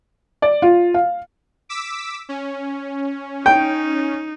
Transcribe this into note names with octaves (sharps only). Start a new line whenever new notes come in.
D5
F4
F5
D6 E6 B6
C#4
D#4 G5